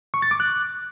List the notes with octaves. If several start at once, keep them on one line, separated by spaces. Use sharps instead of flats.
C#6
A6
D6
F#6